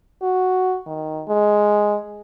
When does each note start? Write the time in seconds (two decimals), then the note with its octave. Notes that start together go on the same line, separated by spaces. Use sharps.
0.22 F#4
0.87 D#3
1.28 G#3